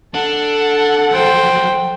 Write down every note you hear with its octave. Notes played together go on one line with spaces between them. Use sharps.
D4 A4 F#5
F3 F#3 C5 G5